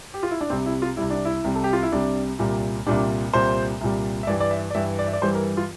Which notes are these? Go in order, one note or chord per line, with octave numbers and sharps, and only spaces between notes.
G4
F4
E4
D4
C2 C3 G3 C4
E4
F4
C2 C3 G3 E4
D4
E4
C2 C3 G3
A4
G4
F4
E4
C2 C3 G3 D4
C2 A#2 G3
C2 A#2 G3 D4
C2 A#2 G3 C5
C2 A#2 G3
E5
G2 E3 G3 D5
D5
E5
D5
G2 E3 G3 E5
D5
E5
D5
G2 E3 G3 C5
A#4
F4